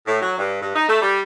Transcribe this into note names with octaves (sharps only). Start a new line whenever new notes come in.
A2
F#3
G2
G2
D#4
A3
G3